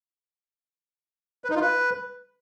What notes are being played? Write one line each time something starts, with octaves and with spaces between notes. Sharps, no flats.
B4
D#4
F4
B4